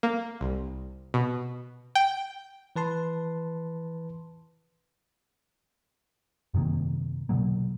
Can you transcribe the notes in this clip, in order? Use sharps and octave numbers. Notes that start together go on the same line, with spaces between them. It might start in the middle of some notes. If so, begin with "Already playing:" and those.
A#3
C2
B2
G5
E3 B4 A5 C6
F#2 C3 D#3 A#3
B2 D3 F#3 A#3